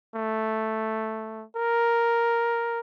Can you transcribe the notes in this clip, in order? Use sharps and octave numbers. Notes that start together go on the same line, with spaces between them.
A3
A#4